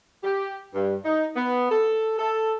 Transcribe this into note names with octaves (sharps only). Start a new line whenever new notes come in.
G4
G2
D#4
B3
A4
A4